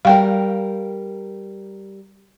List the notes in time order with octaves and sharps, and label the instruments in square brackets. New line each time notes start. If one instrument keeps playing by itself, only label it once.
[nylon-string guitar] G3 A#4 [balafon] F5 G5